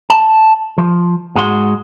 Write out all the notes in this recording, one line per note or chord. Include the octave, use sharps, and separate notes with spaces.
A5
F3
G#2 G#3 F#4 C5 C6